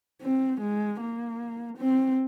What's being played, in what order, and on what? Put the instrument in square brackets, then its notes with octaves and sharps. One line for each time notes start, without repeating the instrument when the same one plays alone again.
[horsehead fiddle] C4
G#3
A#3
C4